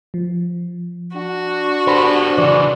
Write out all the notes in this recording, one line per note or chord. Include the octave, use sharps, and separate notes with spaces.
F3
D4 F#4
G4 A4 C5 F#5 B5
C#3 E3 D5